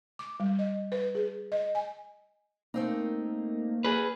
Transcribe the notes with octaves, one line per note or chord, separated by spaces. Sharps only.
D6
G3
D#5
B4
G#4
D#5
G#5
A3 A#3 C4 D#4
G#4 B4